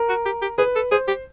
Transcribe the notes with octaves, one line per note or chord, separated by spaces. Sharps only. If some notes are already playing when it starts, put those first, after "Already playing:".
Already playing: A#4
F#4
G4
G4
G#4 B4
A4
G#4 C5
G4